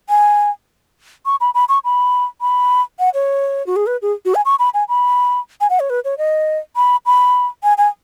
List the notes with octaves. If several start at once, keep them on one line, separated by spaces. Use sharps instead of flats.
G#5
C#6
B5
B5
C#6
B5
B5
F#5
C#5
F#4
G#4
B4
G#4
F#4
G#5
C#6
B5
G#5
B5
G#5
F#5
C#5
B4
C#5
D#5
B5
B5
G#5
G#5